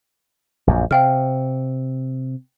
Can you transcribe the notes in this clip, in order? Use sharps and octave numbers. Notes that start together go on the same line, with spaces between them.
A#1 F#2
C3 F5 G5 F6